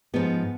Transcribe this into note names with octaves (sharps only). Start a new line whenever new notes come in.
G#2 F3 G#3 B3